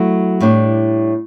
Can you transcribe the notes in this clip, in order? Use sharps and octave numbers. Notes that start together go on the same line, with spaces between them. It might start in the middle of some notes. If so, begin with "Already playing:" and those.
Already playing: F#3 A3 E4
A2 G3 D4